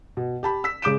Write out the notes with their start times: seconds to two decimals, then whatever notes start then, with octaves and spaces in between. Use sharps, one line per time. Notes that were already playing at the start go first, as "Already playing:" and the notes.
0.17 B2
0.43 G4 A5 B5
0.64 E6 B6
0.82 C#3 G#3 D6 G6 D7 E7